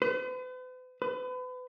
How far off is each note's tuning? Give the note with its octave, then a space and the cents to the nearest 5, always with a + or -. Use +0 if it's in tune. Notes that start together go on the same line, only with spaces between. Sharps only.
B4 +45
B4 +35